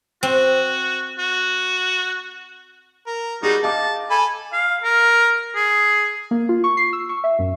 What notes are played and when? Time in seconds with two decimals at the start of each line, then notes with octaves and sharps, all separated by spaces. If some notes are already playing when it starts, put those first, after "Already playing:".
0.23 C4 F#4
1.18 F#4
3.07 A#4
3.43 G3 D#4 F#4 G#4
3.63 D#5 F5 A5 D6
4.10 A4 G#5 B5
4.53 F5
4.84 A#4
5.55 G#4
6.31 A#3
6.49 F4
6.64 C#6
6.77 C7
6.93 E6
7.09 C#6
7.24 E5
7.39 F#2